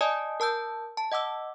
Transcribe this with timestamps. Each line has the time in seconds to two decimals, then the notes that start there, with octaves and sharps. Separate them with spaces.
0.01 D5 D#5 G#5 A5 D#6
0.40 A#4 A5 E6 G6
0.97 A5
1.12 D#5 F#5 D6 E6